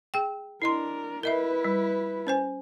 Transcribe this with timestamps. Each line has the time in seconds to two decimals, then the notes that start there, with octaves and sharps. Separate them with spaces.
0.14 G#4 G5
0.62 D4 E4 A#4 D#5 C6
1.23 E4 A#4 B4 D#5 E5
1.64 G3
2.27 C#4 C5 G#5